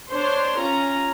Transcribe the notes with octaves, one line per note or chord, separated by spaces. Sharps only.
D4 C5 C#5 C6
C#4 F4 A#5